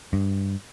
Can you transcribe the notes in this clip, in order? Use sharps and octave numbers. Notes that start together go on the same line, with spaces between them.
G2